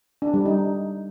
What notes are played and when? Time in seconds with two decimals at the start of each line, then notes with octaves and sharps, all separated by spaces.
0.22 D4
0.34 G3
0.45 D#4